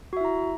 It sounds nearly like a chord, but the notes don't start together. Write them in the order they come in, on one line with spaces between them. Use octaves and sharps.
F#4 E5 E4 A#5